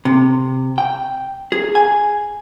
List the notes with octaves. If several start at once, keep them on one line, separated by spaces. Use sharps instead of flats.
C3
G5
G#4
G#5